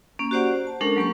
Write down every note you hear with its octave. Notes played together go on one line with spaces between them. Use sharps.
A#3 C#4
F#4 G4 C5 D5 F#5
C5
A5
G#3 C#4 D4 A4 A#4
F#3 A#3 G4 C#6